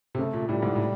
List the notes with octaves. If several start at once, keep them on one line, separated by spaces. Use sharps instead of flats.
C3
C#3 A3
A#2
A2 G3
G#2
A2